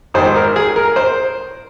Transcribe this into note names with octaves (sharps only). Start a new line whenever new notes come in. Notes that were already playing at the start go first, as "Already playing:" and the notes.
G#1 G#2 D#3 C5
A#4
G#4
A#4
C5